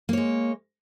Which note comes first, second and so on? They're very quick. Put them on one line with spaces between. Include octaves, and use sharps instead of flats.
A#3 C#5 G#3